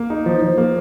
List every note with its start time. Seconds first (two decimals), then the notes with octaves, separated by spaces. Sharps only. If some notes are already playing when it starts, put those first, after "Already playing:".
Already playing: A#3
0.10 D#4
0.26 F3
0.42 F3
0.58 A#3